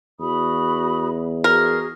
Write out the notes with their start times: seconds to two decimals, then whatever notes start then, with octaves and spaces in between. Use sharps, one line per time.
0.19 E2 F#4 B5 D#6
1.44 F#4 G#4 A#4